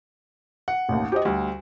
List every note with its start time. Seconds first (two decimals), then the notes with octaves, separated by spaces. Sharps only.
0.68 F#5
0.89 A1 D#2
1.12 G4 C5 D#5
1.25 D2 G3